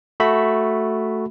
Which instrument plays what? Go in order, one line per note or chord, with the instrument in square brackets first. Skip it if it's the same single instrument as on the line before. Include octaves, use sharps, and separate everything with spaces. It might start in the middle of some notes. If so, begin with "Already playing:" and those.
[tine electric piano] A3 F#4 E5 B5